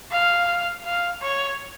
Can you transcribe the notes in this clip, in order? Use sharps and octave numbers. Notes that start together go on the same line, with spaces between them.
F5
F5
C#5